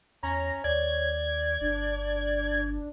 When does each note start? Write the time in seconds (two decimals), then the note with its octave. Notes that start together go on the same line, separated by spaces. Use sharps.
0.23 E2 C#4 C#5 A#5
0.64 D#2 D5 G#6
1.61 G1 D4